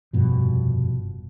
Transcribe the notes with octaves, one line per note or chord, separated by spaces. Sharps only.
F1 G2 B2 F3